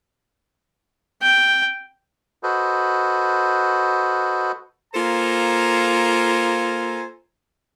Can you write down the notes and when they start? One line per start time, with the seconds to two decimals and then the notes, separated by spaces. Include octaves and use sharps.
1.22 G5
2.43 F#4 A4 B4 C5 D#5
4.94 A#3 F4 A4 C5 G#5 A#5